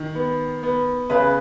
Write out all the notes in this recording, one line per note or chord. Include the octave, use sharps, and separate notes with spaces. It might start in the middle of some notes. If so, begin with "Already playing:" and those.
Already playing: D#3
B3
B3
C#3 B4